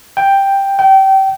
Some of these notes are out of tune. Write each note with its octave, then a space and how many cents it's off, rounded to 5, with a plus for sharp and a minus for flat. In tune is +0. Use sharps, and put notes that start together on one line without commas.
G5 +5
G5 -25